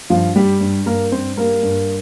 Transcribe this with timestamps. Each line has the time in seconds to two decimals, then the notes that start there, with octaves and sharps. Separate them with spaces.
0.10 G2 F3 F4
0.36 G3 G4
0.61 G2
0.86 G2 A#3 A#4
1.12 G2 C4 C5
1.37 G3 A#3 A#4
1.63 G2